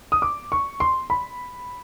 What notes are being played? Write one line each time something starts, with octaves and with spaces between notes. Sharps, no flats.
D#6
D6
C#6
C6
B5